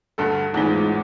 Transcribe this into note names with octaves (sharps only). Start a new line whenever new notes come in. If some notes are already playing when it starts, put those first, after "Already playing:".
D2 G2 A4
A1 E2 G#2 G#3 A3 C4 D#4 F4